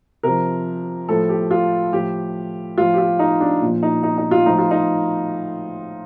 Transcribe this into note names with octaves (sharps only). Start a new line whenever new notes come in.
C3 F3 A#4
A2 F3 A4
G4
F4
A2 F3 G4
A2 F3 F4
G4
F4
D#4
D4
A#2 F3
D#4
D#4
D#4
F4
A2 F3 D#4
F4
D#4